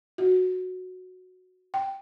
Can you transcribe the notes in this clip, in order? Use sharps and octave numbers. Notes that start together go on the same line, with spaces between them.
F#4
G5